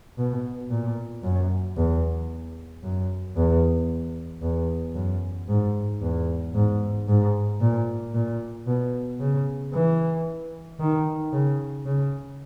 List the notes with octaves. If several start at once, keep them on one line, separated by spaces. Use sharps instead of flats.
B2
A#2
F#2
E2
F#2
E2
E2
F#2
G#2
E2
G#2
G#2
A#2
A#2
B2
C#3
E3
D#3
C#3
C#3